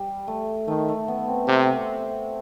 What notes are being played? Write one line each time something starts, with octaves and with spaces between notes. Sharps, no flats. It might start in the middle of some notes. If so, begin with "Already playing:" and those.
Already playing: G3
A3
D#3 A3
A3
B3
C4
C3 C4